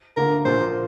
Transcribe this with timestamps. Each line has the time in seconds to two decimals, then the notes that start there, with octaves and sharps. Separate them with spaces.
0.17 D2 D3 A#3 A#4
0.45 A#1 A#2 F3 A#3 F4 C5